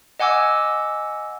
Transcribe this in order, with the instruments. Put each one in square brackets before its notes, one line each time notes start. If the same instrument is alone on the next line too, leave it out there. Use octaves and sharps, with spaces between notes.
[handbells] D#5 F#5 G#5 D6 E6